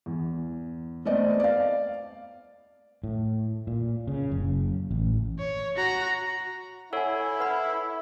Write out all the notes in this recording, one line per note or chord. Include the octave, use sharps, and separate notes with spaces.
E2
A3 B3 C4 D5 D#5
D5 F5
A2
A#2
C#3
F#1
A1
C#5
F#4 A#5
E4 A4 C#5 F#5 G#5 E6
B4 F#5 B5